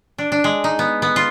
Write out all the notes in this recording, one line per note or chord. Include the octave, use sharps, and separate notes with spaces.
D4
D4
G#3
D#4
B3
B3
F4